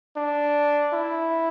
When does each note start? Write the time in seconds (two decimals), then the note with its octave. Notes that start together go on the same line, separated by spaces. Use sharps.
0.17 D4
0.93 E4